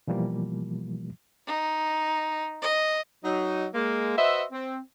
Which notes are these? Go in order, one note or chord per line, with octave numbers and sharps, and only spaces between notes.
B2 E3 F3 G3 A#3
D#4
D#5
F#3 D#4
G#3 A#3
F#4 B4 C5 D#5 E5
C4